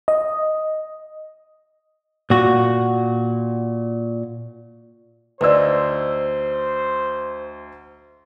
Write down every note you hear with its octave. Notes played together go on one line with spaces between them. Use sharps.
D#5
A#2 F#4
D2 D#4 B4 C5 D5 E6